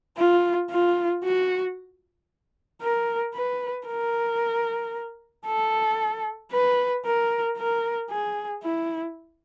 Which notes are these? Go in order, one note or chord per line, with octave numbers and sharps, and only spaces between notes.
F4
F4
F#4
A#4
B4
A#4
A4
B4
A#4
A#4
G#4
E4